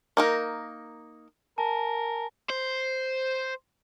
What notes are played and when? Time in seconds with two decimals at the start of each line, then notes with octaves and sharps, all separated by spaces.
0.17 A#3 D#4 A#4
1.58 A#4 G#5 A5
2.50 C5